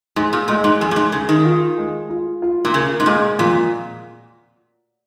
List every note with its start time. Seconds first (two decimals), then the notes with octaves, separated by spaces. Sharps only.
0.16 G#2 G#4
0.33 A#2
0.48 A#2 G#3
0.64 G#2
0.81 F2 G#4
0.91 A#2
0.96 G#2
1.12 C#3 G#4
1.29 D#3
1.45 F4
1.78 G#3
2.10 F4
2.42 F4
2.65 A#2
2.74 C#3 A#4
3.00 G#2
3.06 A#2 G#3
3.39 F2 A#2